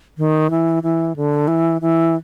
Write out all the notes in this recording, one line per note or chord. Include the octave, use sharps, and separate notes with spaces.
D#3
E3
E3
D3
E3
E3